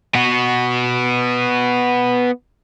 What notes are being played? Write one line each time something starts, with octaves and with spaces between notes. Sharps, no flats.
B3 F#4